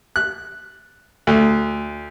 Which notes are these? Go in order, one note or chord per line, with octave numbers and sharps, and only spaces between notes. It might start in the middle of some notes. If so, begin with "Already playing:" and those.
F#6
D2